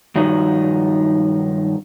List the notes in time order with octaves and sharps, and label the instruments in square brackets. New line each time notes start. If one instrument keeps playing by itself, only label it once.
[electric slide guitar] G2 D#3 F3 F#3 D#4